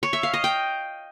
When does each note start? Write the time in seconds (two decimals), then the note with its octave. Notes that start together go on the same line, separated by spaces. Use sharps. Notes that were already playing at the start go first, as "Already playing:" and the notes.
0.03 C#5
0.13 E5
0.23 F5
0.34 D#5
0.44 G5